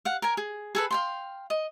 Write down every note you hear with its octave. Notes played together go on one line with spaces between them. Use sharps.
F5 F#5
A#4 G#5
G#4
G#4 A4 B4
F5 G5 C6
D#5